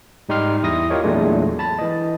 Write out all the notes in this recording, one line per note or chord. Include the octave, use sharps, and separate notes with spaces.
G#2 G3 D#4 G4 C6 F6
E2 E4 D#6 A#6
F4 G4 A#4 C#5 D#5
E2 A#2 F#3 G#3 A3 D4
A5 B5 A6
E3 D#5